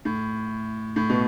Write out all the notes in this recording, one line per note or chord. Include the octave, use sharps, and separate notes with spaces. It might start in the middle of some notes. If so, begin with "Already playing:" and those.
A2
A2
B2